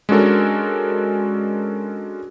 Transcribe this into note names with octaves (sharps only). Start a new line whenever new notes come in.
G#3 C#4 D4 F#4 A4 A#4